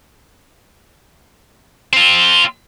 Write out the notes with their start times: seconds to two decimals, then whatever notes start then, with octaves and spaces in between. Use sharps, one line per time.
1.93 C4 F4